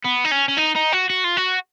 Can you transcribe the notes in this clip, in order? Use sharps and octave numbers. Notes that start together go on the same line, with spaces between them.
B3
D#4
C#4
C#4
D#4
D#4
F#4
F#4
F4
F#4